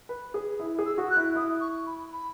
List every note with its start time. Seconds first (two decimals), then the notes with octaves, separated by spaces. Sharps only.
0.09 B4
0.34 G#4
0.60 E4
0.79 G#4
0.85 E6
0.98 F#4
1.10 F#6
1.17 E4
1.35 E4 D#6
1.61 C#6
1.86 B5
2.12 B5